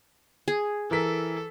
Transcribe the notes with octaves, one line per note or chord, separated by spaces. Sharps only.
G#4
E3 A4 A#4 B6